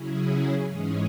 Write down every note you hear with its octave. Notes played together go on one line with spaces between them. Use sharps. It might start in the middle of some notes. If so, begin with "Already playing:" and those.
Already playing: C#3 F#3 C#4 E4 G#4
G#2 E3 G#3 C#4 G#4